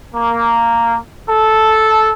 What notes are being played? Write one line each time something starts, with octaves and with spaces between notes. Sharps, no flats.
A#3
A4